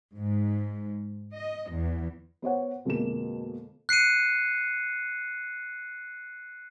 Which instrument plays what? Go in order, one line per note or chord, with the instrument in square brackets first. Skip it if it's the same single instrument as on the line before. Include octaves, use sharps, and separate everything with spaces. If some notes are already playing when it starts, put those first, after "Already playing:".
[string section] G#2
D#5
E2
[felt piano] B3 C5 C#5 F#5
F2 B2 D3 G#3 A#3 E7
[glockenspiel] F#6 C7 C#7 D#7